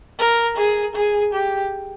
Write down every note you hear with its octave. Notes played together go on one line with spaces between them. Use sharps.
A#4
G#4
G#4
G4